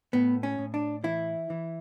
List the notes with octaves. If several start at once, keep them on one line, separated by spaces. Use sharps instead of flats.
A2 B3
C#4
A2
D4
E3 E4
E3